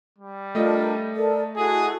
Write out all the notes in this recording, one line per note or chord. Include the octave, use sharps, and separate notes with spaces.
G3
A3 D4 F4 A#4 D#5
A4 A#4 D5
E4 F#4 G#4 A4